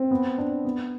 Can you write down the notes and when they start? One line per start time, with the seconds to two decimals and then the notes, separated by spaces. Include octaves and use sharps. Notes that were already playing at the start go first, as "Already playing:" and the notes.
Already playing: C4
0.11 B3
0.38 D4
0.65 B3